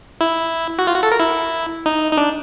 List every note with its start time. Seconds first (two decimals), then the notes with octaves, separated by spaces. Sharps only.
0.21 E4
0.79 F#4
0.87 F4
0.95 F#4
1.03 A4
1.12 A#4
1.20 E4
1.86 D#4
2.13 D#4
2.17 D4